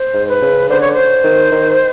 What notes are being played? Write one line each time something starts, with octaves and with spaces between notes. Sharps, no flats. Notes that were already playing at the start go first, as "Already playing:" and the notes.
Already playing: C5
G#2
B4
C#3
D3 C5
C#5
C5
D#3
D#3